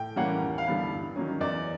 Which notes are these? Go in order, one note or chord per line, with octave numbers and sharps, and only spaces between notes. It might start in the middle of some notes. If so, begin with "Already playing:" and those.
Already playing: A2 G5
E3 G3 A#3 C#4 F#5
D#2
F5
D3 G3 B3 E4
G2
D#3 F#3 A#3 C#4
E2 D5